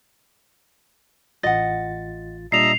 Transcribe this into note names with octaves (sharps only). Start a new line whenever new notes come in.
A1 F4 D#5 F#5 A6
A#2 G3 D4 D#5 E5 A#5 C7 F7